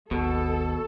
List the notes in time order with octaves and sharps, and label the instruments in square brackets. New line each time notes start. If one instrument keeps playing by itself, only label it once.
[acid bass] G#1 [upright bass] D#2 [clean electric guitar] B2 [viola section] A4